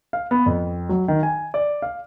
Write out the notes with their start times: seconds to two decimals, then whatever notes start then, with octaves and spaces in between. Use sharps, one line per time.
0.13 F5
0.31 B3
0.46 F2
0.89 F#3
1.08 D#3
1.23 G#5
1.54 D5
1.82 F5